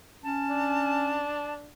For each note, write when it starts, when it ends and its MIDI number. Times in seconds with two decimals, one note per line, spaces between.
0.24 1.30 61
0.24 1.54 81
0.49 1.71 62